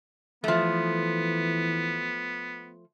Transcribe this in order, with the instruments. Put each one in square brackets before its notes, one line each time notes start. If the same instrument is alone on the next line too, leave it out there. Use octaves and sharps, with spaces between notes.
[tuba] E3 [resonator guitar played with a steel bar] F3 A3 [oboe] B3